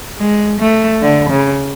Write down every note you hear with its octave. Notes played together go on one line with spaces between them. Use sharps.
G#3
A3
D3
C#3